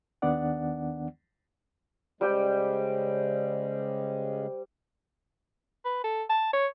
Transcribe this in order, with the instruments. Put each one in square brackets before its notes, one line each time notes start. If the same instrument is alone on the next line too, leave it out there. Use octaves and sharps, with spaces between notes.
[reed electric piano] D#2 D#3 B3 D4 D5 F#5
[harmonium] C#3 G#3 [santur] G3 G4 G5 [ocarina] C5
[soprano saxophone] B4
A4
A5
C#5